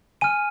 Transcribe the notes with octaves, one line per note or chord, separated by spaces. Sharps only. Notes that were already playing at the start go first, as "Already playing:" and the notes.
G#5 F6 D#7